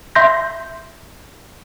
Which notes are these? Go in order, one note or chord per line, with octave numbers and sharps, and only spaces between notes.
E5 C6 G6 A#6